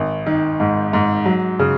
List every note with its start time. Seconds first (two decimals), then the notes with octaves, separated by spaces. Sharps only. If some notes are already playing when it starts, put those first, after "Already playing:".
Already playing: G#1
0.26 D#3
0.60 G#2
0.93 G#2
1.26 F#3
1.59 C#3